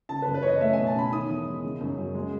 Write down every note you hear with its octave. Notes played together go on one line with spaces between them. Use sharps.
C#3 A5
B4
F#2
B4
E3 C#5 D#5
A3 E5
B2 G#5
A5
C#4 B5
D#3 D#6
E2
G#3
C#3
F#2
F#3
G#3